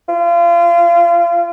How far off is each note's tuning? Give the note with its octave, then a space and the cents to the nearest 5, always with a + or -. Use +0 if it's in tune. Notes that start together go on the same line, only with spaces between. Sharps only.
F4 -30